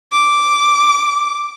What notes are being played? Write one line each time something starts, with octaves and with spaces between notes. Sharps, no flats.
D6